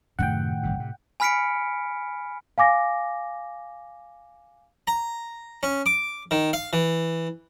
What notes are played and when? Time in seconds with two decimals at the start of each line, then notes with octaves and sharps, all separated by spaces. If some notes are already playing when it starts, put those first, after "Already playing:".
0.19 F#2 A2 C3 D#3 F#5 G5
0.63 G1 C2 C3
0.79 A2 C3
1.20 G#5 B5 F6 B6 C#7 D7
2.58 F5 G#5 D6 A#6
4.87 A#5
5.63 C#4
5.86 D6
6.31 D#3
6.53 F5
6.73 E3